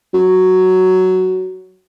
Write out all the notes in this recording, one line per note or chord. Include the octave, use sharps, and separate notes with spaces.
F#3